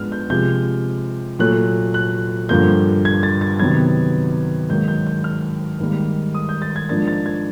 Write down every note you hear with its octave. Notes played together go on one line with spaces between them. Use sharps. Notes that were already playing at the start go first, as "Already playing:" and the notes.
Already playing: G#2 F3 G#3 B3 D4 F6
G6
C3 F3 G#3 G6
A#2 F#3 A3 F#6
F#6
G2 D3 F3 A#3 G6
G#6
A6
A6
C3 D#3 F#3 B3 G#6
G#2 D#3 F#3 A#3 G6
G6
G6
F6
G#2 D#3 G3 A#3
D#6
G6
A6
G#6
G#2 F3 A#3 D4 A6
A6
G#6